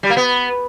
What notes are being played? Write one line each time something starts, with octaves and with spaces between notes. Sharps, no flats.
G3
A#3
B3